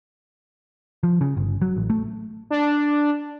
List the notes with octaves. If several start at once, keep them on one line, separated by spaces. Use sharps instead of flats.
F3
C#3
G1
F#3
A1
A3
D4